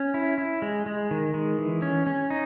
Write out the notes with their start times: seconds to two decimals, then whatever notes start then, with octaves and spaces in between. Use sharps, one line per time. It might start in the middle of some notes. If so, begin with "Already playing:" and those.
Already playing: C#4
0.14 E4
0.38 E4
0.62 G#3
0.86 G#3
1.11 D#3
1.34 G#3
1.59 E3
1.82 C#4
2.07 C#4
2.30 D#4